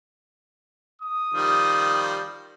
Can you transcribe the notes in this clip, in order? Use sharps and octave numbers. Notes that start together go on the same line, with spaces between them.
D#6
D#3 F3 G3